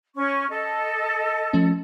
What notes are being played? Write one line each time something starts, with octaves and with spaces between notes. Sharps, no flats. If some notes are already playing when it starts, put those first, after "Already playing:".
C#4 C#6
A4 D#5
F3 A3 C#4